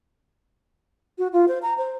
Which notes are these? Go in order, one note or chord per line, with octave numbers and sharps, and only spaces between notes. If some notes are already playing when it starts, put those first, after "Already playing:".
F#4
F4
C5
A#5
C5